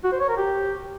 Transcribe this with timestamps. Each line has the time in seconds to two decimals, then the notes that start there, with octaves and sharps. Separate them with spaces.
0.04 F#4
0.12 C5
0.20 C#5
0.29 A#4
0.37 G4